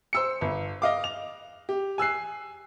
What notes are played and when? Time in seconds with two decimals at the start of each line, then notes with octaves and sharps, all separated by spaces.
0.13 C5 E6 C#7
0.41 G1
0.82 D#5 F5 D6
1.04 F7
1.69 G4
1.98 G#5 E6 F#6 C7